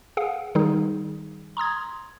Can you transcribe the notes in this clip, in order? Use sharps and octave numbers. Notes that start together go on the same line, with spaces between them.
G#4 F5 F#5
D#3 G3 D#4 G#4
A#5 C6 D#6 G#6